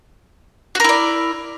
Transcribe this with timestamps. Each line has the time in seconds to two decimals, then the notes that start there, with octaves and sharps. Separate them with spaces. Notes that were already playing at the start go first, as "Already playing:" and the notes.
0.75 F#4
0.80 A#4
0.84 E4
0.89 D5